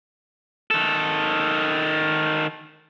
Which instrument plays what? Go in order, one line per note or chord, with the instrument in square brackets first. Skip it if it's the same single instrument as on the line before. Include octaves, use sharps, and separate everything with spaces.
[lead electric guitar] D#3 A4